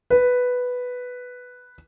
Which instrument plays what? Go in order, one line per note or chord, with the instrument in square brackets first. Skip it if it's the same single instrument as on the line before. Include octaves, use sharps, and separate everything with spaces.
[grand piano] B4